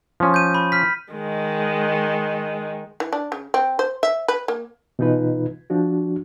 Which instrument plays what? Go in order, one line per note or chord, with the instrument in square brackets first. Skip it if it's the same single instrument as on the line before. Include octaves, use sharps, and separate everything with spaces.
[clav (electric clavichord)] F3 C#4
[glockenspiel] G6 D#7
B5
F6 B6
[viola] D#3 G#3
[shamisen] E3
D4
C#3
C4
C5
E5
B4
A#3
[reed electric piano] B2 E3 D#4 F4 B4
F3 D4 F#4